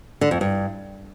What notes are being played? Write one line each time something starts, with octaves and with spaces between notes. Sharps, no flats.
D3
F2
G2